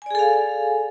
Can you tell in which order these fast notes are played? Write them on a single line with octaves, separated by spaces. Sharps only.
G#5 D5 G#4 A4 F5